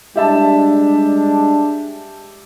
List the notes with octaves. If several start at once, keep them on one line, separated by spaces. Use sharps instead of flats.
G3 G#3 D4 G4 E5 A5